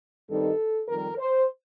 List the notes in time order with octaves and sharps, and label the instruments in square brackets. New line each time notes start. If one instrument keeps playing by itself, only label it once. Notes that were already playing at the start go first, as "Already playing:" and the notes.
[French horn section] G2 D#3 G3 C4 D#4 A4
F2 D#3 G3 A#4
C5